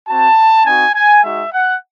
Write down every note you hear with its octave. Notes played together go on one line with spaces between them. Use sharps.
C4 F#4 A5
C4 D#4 F#4 G#5
G#5
G#3 D#4 F#4 E5
F#5